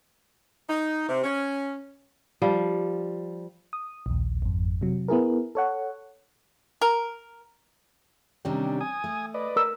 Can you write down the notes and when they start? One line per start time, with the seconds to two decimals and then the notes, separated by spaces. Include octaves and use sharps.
0.69 D#4
1.09 C3
1.24 C#4
2.42 F3 G3
3.73 D#6
4.06 A#1 D#2
4.42 G#1 F2
4.81 C3 F#3
5.08 B3 E4 G#4 A#4
5.55 A4 C#5 F#5
6.81 A#4
8.45 C3 D#3 G3 C#4 D4 G4
8.81 G#5 D#6
9.04 A3
9.34 B4 D5 D#5
9.56 A#4 E6